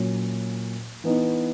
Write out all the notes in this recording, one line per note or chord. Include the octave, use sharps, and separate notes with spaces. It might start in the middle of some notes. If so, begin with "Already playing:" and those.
Already playing: A#2 F#3 C#4
E3 B3 D#4